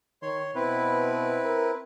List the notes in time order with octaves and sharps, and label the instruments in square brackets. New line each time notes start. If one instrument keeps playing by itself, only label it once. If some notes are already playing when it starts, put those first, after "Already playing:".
[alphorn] D#3 [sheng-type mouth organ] C#5 C6
[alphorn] B2 [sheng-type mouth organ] C4 E4 B4
[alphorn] A#4